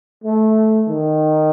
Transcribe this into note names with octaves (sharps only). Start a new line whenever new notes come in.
A3
D#3